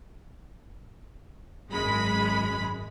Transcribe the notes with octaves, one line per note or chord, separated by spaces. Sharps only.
G#1 F#2 G#3 B5